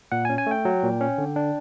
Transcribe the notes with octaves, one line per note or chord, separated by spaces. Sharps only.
A#2 F#5
G#5
C#4
G#5
A3 G5
F#3
A#2
C#4
D3
D4